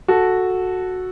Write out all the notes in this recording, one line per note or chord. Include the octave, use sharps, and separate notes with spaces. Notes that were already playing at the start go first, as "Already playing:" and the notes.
F#4 A4